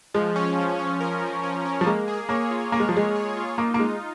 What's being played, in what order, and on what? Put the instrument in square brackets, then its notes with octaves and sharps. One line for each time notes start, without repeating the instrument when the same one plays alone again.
[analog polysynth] F3 [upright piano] G#3
[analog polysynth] C#4
F3
C#4
A#4
F3
C#4
C#4
[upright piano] F3
[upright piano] G#3 [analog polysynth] A#3
[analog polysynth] G#4
[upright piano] A#3 [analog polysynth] C#5
[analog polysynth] F4
[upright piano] A#3 [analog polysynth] G#4
[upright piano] G#3
F3
[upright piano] G#3 [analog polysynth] A#3
[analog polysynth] C#5
F4
[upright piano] A#3 [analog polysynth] D#4
[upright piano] A#3
[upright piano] G#3 [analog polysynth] D#4